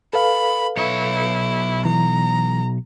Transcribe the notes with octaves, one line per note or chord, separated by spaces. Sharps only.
A4 B4 F5 B5
B1 E4 C#5
E3 A#5